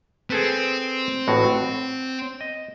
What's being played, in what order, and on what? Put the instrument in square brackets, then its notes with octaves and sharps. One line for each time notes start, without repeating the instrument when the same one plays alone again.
[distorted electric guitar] C4 [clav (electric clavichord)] G#4 A4 B4
[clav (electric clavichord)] A1 A2 F#4
F#5
D#5